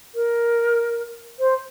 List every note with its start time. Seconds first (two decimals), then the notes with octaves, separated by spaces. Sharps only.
0.14 A#4
1.39 C5